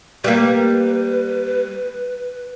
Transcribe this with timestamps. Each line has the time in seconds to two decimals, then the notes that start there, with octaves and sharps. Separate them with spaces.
0.24 G3 A#3 B4